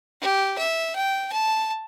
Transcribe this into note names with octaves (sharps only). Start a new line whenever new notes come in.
G4
E5
G5
A5